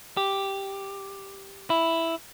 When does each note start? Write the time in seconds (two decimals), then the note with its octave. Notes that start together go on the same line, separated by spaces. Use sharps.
0.17 G4
1.70 E4